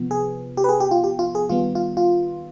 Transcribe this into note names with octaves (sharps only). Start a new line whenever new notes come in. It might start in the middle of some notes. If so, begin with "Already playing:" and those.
Already playing: C3 F3 B3
G#4
G4
B4
G#4
G4
F4
G4
F4
G#4
D#3 G3 B3 F4
F4
F4